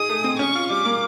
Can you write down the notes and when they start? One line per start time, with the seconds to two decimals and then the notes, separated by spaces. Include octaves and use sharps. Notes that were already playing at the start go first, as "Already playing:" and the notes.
Already playing: D#4 G#4 D#6
0.09 A3
0.24 C4
0.39 C#4 C#6
0.55 F4
0.70 G3 D6
0.85 A#3